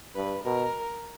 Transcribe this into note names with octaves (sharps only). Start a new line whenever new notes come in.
G2 B4
B2 A#4